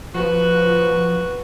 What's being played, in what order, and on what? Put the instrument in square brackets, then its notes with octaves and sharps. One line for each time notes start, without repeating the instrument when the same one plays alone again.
[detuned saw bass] F3 [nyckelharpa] F#4 B4